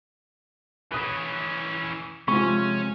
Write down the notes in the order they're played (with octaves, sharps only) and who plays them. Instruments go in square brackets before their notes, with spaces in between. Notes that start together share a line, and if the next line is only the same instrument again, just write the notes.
[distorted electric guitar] E3 C#4 [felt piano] D#6 F#6
[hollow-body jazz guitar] C3 F3 [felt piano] G#3 F4 [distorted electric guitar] C#4 [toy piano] C#6